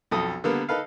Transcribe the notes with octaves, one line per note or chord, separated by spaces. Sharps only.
B1 F2 A4 D#6
D3 G3 A#3 B3
D#4 A4 B4 F5